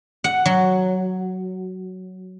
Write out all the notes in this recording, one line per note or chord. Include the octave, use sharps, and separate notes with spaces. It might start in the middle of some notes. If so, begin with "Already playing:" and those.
F#5
F#3